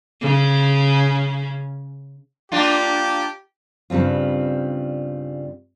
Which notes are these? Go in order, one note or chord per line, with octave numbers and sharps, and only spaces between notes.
C#3 C#4
A#3 D4 F4 G4
G2 C#3 G3 C4 F4